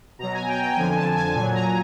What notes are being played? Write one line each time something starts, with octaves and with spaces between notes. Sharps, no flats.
B2 F#3 A#5
G#5
G5
G5
G5
F2 D3 F3 G#5
A5
A5
G#5
A#2 F#3 G#5
A#5